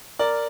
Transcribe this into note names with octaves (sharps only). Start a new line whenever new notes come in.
A#4 D5